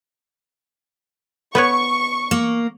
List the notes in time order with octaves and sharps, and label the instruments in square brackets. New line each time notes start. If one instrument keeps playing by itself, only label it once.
[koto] B3 B4 C#5 [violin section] C#6
[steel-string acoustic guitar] A#3